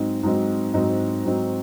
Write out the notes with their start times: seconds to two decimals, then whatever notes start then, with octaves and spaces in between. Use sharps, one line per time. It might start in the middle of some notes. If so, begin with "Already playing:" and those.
Already playing: G#2 F#3 C4 D#4
0.23 G#2 F#3 C4 D#4
0.74 G#2 F#3 C4 D#4
1.25 G#2 F#3 C4 D#4